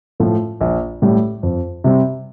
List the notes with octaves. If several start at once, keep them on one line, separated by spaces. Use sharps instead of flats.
A2 F3 A3
A#1
A2 G3
F2
C3 G3 C4